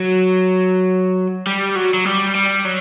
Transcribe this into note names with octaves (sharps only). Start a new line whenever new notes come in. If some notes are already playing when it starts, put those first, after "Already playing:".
Already playing: F#3
G3
F#3
F#3
G3
G3
F#3